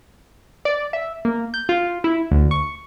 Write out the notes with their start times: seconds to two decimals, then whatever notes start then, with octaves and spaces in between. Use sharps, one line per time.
0.65 D5
0.93 E5
1.25 A#3
1.54 G6
1.69 F4
2.04 E4
2.31 D2
2.51 C#6